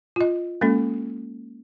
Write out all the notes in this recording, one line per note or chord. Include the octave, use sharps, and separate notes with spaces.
F4 D#5
G#3 A#3 C#4 A4